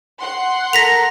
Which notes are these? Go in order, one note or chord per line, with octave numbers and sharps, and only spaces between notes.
F#5 C6
A4 A#4 A#5 A#6 B6 F7